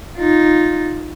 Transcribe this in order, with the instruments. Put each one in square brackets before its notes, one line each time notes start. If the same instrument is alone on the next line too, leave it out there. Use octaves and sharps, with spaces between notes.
[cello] D#4 F4